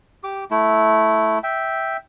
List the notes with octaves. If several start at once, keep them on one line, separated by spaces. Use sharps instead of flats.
G4 D6
A3 E4
E5 G5